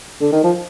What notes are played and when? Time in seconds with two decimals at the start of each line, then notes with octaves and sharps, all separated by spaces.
0.21 D3
0.32 D#3
0.44 F3